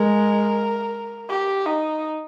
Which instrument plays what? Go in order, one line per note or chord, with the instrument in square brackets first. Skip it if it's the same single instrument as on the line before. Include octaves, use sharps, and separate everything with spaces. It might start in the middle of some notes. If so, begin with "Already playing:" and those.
Already playing: [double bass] G#3 [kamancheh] A#4
[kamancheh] G4
D#4